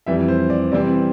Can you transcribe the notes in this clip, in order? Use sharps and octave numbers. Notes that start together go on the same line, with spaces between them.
F2 E3 G3 E5
C5
D5
C3 E3 G3 C4 D5